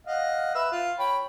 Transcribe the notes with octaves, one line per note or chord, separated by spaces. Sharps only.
D#5 F5 F#5
B4 E5 E6
F4
C#5 G5 B5